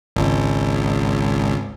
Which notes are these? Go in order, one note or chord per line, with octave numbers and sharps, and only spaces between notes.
G#1 C#2